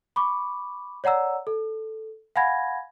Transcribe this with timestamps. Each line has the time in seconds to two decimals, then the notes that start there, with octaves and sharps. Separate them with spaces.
0.16 B5 C#6 D6
1.04 C#5 D5 F#5 A#5 E6
1.47 A4
2.36 F5 F#5 G#5 B5 G#6 A#6